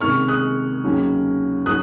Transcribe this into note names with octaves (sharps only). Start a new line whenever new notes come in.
C#2 C3 D#3 A#3 D#4 C#6 F6
D#6 F#6
D#2 C#3 F#3 C#4
F#3 C#4 D#6 F#6